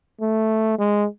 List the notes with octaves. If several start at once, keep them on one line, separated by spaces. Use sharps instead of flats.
A3
G#3